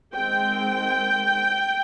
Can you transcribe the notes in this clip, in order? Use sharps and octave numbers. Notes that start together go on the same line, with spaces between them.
D#3 G#3 C4 G5